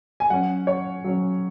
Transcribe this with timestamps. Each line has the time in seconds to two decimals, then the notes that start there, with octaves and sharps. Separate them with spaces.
0.20 G#5
0.30 F#3 C#4 F#5
0.67 C#5
1.04 F#3 C#4